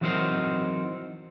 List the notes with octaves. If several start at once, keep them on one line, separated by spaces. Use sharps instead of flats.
E3 F#3 C4 D#4 A#4 C5